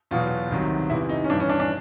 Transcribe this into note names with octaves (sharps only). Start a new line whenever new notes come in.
E2 B2 F#3 F4
C2 C3 D#3 F#3
E2 C3 E3 E4
D#4
C#4
G2 E3 D4
C#4
D4
D4